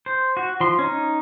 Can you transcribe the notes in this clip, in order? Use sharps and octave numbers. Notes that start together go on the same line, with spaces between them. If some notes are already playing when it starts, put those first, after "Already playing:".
C5
F#4
F3 C6
C#4 D#4